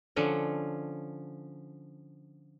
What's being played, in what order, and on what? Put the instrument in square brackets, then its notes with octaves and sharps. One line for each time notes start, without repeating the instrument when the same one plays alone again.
[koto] D3 F3 C#4